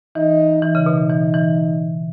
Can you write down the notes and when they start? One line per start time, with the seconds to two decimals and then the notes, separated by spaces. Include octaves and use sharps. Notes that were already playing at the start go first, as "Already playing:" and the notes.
0.15 E3 D#4
0.62 E3 D#4
0.75 C#3
0.86 B2
0.98 B2
1.10 E3
1.34 E3